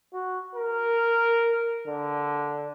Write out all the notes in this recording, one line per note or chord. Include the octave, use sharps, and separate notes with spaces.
F#4
A#4
D3